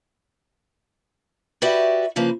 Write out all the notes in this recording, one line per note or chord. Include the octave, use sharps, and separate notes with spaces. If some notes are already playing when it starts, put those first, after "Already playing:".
F#4 G4 B4 D5 E5
C#3 F3 A#3 B4